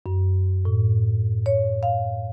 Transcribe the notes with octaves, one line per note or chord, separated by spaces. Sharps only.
F#2
A2
C#5
F5